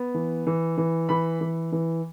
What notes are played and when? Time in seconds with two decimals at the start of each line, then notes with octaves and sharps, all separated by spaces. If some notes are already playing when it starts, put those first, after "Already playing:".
Already playing: B3
0.14 E3
0.47 E3
0.78 E3
1.09 E3 B5
1.41 E3
1.72 E3